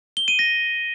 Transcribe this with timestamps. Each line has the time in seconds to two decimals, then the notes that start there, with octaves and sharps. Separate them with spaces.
0.17 G7
0.28 D#7
0.39 A#6